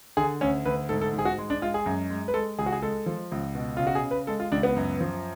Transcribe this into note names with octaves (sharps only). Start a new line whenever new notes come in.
D3 G#4
D2 C#4
D2 B4
G#2 A4
A4
G#2
G#4
F#4
G#3
D4
G#3 F4
G#4
F#2
G#3
B4
G#3 A4
C#2 G#4
F#4
G#4
G#3 A4
F3
C#2
B2
C#3 F4
F#4
G#4
C#3
B4
G#3 A4
F4
C#2 D4
B3
F#2
F3